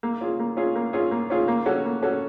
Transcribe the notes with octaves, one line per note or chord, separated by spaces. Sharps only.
A#3
C#4 F4 G#4
A#3
C#4 F4 G#4
A#3
C#4 F4 G#4
A#3
C#4 F4 G#4
A#3
C#4 F#4 A4
A#3
C#4 F#4 A4